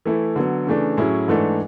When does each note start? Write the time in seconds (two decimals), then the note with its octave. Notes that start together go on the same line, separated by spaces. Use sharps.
0.06 E3 A3 E4 A4
0.36 D3 F#3 B3
0.67 C#3 E3 A3 D4
0.97 A2 F#3 C#4 E4 G#4
1.28 G#2 E3 A3 D4 A4